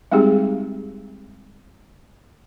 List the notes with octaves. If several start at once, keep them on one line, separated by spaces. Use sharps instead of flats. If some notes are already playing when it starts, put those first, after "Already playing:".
G3 G#3 C4 D#4 G4 G#4